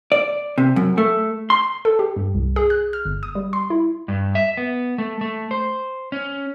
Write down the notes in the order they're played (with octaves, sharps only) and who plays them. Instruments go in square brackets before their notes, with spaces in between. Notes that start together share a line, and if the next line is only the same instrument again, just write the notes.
[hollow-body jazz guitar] D5
C3
F#2
A3
C6
[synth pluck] A4
G4
G2
C2
G#4
F#6
F6
G1
D#6
G3
C6
E4
[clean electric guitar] G2
E5
B3
A3
A3
C5
C#4